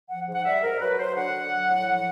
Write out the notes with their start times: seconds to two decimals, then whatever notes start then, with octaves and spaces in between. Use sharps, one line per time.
0.09 F3 F#5
0.27 G#2
0.33 F#5
0.45 G3 E5
0.62 G#2 A#4
0.80 F#3 B4
0.98 F#3 C5
1.15 D3 F#5
1.33 D3
1.51 F#3
1.67 A2
1.86 F3